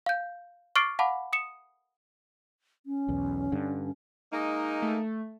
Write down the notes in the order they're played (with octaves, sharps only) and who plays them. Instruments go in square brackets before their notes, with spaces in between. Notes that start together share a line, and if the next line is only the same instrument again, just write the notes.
[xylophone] F5 G6
C#6 D6 F6 A6 C7 D7
F5 F#5 A5 B5 D6
D#6 C#7 E7
[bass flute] C#4
[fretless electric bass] B1 E2
G2 D3
[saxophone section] G#3 A#3 D#4
[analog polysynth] A3